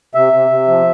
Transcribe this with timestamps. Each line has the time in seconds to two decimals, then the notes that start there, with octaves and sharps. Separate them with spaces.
0.15 C3 E5
0.33 C3
0.50 C3
0.68 F3